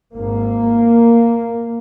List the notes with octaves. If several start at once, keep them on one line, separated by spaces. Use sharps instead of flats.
G#1 G#2 A#3